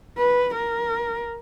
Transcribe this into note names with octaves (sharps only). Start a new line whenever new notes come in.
B4
A#4